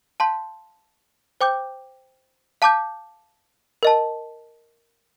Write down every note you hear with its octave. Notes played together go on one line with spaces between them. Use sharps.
F5 A5 C6 G6
C5 G5 D6 G6
F5 A5 D6 G6
A#4 D#5 A5